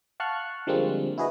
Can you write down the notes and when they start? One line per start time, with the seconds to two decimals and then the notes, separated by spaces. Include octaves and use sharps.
0.20 F5 F#5 A5 C#6 F6 F#6
0.67 D3 F3 G3 G#3 A#3 C4
1.18 E4 F#4 G#4 B4 D#5